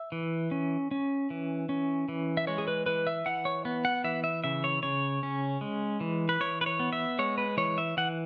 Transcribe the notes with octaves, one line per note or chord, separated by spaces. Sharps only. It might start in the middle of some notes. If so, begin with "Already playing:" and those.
Already playing: E5
E3
C#4
C#4
E3
C#4
E3
E5
G#3 C#5
G#4
B4
E3 B4
E5
E3 F#5
C#5
B3
F#5
E3 E5
E5
C#3 E5
C#5
C#3 C#5
C#4
G#3
E3
B4
E3 C#5
B4
C#5
B3
E5
G#3 C#5
B4
E3 C#5
E5
E3 F#5